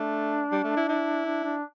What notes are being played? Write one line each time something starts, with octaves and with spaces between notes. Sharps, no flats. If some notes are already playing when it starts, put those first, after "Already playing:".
Already playing: A3 D4
G3
A3
E4
E4
D4
D4